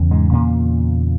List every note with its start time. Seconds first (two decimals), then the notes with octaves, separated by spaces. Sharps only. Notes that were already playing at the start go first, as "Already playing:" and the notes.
Already playing: E2 C#3
0.11 G#2 G#3
0.32 A#2 A#3